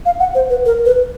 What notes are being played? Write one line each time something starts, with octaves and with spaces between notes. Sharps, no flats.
F5
F#5
C5
B4
A#4
B4